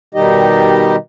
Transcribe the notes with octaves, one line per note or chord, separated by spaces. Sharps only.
B2 D#3 G3 D#4 G4 D#5